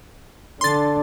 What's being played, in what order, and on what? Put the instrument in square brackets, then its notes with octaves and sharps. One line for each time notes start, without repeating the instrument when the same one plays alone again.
[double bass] D3 D4 [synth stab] C6 A6